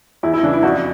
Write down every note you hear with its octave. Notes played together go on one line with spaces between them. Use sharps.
E2 E4
E4
C#3 E3 D4
E4
F2 F#4